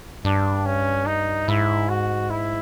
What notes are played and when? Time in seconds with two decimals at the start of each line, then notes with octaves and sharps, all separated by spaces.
0.25 G2 D4
0.66 C#4
1.06 D#4
1.48 G#2 E4
1.89 F#4
2.30 E4